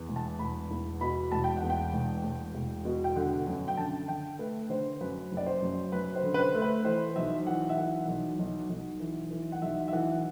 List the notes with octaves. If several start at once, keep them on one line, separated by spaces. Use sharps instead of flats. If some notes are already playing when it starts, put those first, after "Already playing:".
Already playing: E2
E1
A5
E1 B5
E2
B2 B5
E1 A5
G5
F#5
E2
G5
E1
E1
E1
B2
G5
D3 F#5
F#2
G5
D3 A5
D3 G5
A3 B4
D3 C5
F#2 B4
F#1
D5
C5
F#2
F#2 B4
C5
D3
B4
C5
A3
B4
E3 C5
B1 E5
E3 F#5
E5
E3 F#5
B1
B1
B1
E3
E3
F#5
B1 E5
E5
E3 F#5